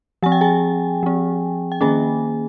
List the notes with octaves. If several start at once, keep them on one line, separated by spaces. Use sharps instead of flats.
F3 C4 G#5
G5
G#4 G#5
F3 C4
G5
D#3 A#3 C#4 G#4 G#5